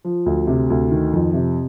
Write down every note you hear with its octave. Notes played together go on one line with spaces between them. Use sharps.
F3
D2
C3
D2
D#3
F2
C3